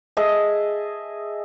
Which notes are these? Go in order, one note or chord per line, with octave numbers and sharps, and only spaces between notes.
G#4 D#5 E5 A5